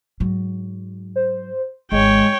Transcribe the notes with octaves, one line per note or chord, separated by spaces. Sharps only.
G#2 F#3
C5
G#1 G#3 C#5 G5